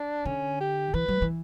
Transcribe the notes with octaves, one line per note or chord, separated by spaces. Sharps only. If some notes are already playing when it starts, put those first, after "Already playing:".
Already playing: D4
D3 C#4
G4
E3 B4
F#3
E3